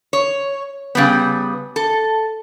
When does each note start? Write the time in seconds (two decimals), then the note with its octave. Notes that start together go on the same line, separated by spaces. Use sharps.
0.13 C#5
0.95 C#3 G3 B3
1.76 A4